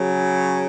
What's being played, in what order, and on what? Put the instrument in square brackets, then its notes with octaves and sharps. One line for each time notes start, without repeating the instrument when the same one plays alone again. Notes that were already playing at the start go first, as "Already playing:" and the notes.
Already playing: [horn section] C#3 F#3